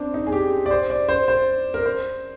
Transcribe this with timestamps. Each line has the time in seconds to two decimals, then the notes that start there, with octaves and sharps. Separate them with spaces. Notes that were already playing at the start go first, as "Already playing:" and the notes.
Already playing: C4 D4
0.14 D#4
0.27 G#4
0.32 G4
0.66 D5
0.71 C5
0.90 D5
1.09 C5
1.28 C5
1.74 A#4
1.85 C5